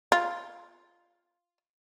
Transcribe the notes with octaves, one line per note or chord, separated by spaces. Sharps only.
F4